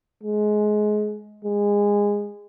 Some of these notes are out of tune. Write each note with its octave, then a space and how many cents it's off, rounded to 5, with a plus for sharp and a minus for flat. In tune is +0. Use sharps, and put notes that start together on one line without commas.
G#3 +20
G#3 -20